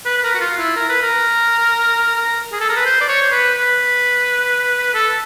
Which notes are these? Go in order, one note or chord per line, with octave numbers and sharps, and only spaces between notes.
B4
B4
A#4
F#4
F4
E4
A#4
B4
A#4
A#4
G#4
A4
A#4
B4
C5
D5
C#5
C5
B4
B4
A4